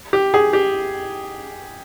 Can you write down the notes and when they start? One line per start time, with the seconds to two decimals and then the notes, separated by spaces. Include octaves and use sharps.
0.13 G4
0.34 G#4
0.53 G4